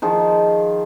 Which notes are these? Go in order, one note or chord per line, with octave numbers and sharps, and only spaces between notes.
D#3 F3 G#4